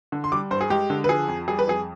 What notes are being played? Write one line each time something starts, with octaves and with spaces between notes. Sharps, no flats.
D3
C6
G3 D6
G2 C5
G#4
G#3 G4
D3
B4
F3 G#4
F2
G3 G#4
B4
F2 G#4